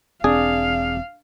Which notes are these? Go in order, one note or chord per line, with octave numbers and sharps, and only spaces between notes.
E1 C4 D4 G#4 F5